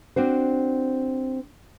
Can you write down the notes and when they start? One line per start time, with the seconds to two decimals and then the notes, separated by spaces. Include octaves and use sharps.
0.16 C4 D4 F#4 C5